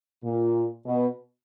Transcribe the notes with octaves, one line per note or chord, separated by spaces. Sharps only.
A#2
B2